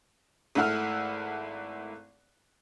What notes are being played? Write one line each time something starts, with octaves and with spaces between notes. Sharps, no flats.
G#1 A3 E4 F#5 E6 F6